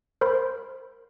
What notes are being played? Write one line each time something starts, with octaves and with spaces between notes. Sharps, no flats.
A#4 C5 B5 C6